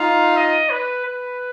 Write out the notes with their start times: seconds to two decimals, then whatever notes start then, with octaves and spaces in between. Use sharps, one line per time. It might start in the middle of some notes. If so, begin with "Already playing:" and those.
Already playing: D#4 F4 F5
0.37 D#5
0.70 B4
1.05 B4